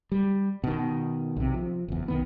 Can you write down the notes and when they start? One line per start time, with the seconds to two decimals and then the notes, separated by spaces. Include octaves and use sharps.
0.12 G3
0.64 B2 D#3
1.37 B1 C3
1.54 F3
1.88 F#1 E2
2.08 B1 D#3 B3